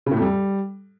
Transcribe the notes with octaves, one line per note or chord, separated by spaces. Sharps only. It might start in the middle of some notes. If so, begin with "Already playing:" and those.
C#3
A2
F2
G3